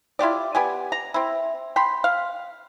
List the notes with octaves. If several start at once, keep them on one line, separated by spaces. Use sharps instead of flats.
E4 F4 G4 D5
B3 G4 G#5
A#5
C4 E4
G5 B5 C6
F5